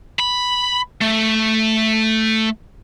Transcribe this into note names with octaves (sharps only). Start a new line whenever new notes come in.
B5
A3